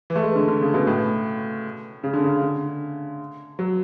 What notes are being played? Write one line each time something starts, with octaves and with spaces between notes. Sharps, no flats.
E3
A3
G#3
D3
D3
C#3
B2
A2
C#3
D3
C#3
D3
F#3